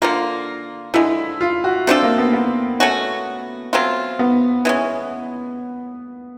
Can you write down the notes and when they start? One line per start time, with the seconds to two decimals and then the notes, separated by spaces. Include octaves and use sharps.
0.02 D3 F3 A#3 F4
0.94 D3 F3 G#3 E4
1.41 F4
1.64 F#4
1.87 A3 C4 D4 F4 A4
2.03 A#3
2.18 B3
2.33 B3
2.80 A3 C#4 F#4
3.73 F#3 A3 C4 F4
4.19 B3
4.65 E3 G#3 C#4